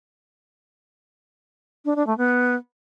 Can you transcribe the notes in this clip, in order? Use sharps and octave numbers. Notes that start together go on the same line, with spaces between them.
D4
D4
A3
B3